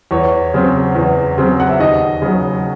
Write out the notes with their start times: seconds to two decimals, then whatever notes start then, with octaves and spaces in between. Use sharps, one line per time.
0.11 E2 C#5
0.54 C#3 F#3 C4
0.95 E2
1.38 C#3 F#3 C4
1.60 F#5
1.69 E5
1.79 D#2 D#5
2.22 C#3 F#3